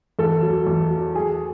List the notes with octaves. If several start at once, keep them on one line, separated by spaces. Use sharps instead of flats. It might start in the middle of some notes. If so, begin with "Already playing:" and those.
E2 A4
F#3
E2
F#3
F#3 G#4